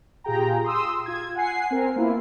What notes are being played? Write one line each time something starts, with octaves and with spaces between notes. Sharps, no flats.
A#2 F4 G4 G#4 G5 A#5
C6 D#6 E6
F4 G#6
F#5 G#5 C7
C4 A#4
A#3 B3 E4 F4